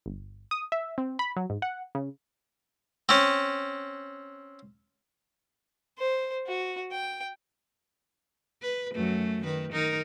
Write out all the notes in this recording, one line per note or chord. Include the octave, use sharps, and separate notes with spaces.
G1
D#6
E5
C4
B5
F#3
G#2
F#5
C#3
C4 C#4
C5
F#4
G5
B4
F#2 F#3 A3
D#3 B4
D#3 D#4 A#4